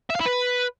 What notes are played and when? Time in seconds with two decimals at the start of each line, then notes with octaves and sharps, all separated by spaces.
0.10 E5
0.15 F5
0.21 E4
0.26 B4